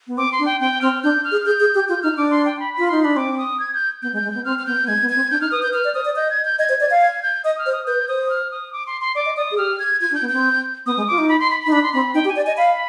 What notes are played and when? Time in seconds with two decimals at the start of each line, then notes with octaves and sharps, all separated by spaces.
0.07 B3
0.17 C4 D6
0.32 C6
0.39 D4
0.46 G5
0.60 C4 G5
0.81 C4 F6
1.03 D4 G6
1.24 F6
1.31 G#4
1.45 G#4 G6
1.60 G#4
1.75 G4
1.89 F4 G6
2.03 D#4 F6
2.17 D4 D6
2.31 C6
2.45 G5
2.60 B5
2.74 F4 B5
2.88 D#4 C6
3.03 D4 B5
3.16 C4 D6
3.38 D#6
3.60 G#6
3.74 G6
4.02 B3 G6
4.13 G#3
4.16 G6
4.24 G#3
4.31 B3 G6
4.45 C4 F6
4.59 F6
4.66 B3 G6
4.83 B3
4.87 G#3 G#6
5.02 B3
5.09 G#6
5.16 C4
5.31 D4 G6
5.41 D#4 F6
5.51 B4 D#6
5.62 B4 G6
5.73 B4 F6
5.84 D5
5.94 C5 D#6
6.05 D5
6.16 D#5 G6
6.30 G#6
6.45 G6
6.59 D#5 G#6
6.69 C5
6.80 D5 G#6
6.91 F5
7.02 G#6
7.23 G6
7.44 D#5 D#6
7.59 F6
7.66 C5
7.73 D#6
7.87 B4 G6
8.08 C5 D#6
8.29 F6
8.51 D#6
8.73 D6
8.87 C6
9.01 C6
9.15 D5 D6
9.26 D#5
9.37 D5 D#6
9.51 G#4
9.58 G4 F6
9.79 G#6
10.01 F4 G#6
10.11 D4
10.15 G6
10.21 B3
10.29 C4 G6
10.86 B3 D#6
10.97 G#3
11.08 F4 D6
11.18 D#4
11.29 B5
11.40 C6
11.50 B5
11.61 B5
11.66 D#4
11.71 D4 B5
11.83 C6
11.93 C4 B5
12.14 D#4 G5
12.25 G4
12.29 G#5
12.36 D5
12.43 D#5 G#5
12.57 F5 B5